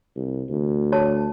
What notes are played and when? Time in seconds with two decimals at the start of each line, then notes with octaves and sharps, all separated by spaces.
0.16 C2
0.49 D2
0.92 C#5 A5